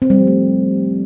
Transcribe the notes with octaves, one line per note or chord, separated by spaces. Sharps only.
C4
G3
F3
A3